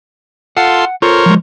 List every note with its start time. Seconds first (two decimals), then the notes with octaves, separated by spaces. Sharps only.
0.57 F4 A4 F#5 C6
1.02 F4 A4 A#4 C5 C#5
1.26 F3 G#3